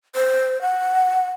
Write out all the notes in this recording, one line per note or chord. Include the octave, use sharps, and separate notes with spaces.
C5
F#5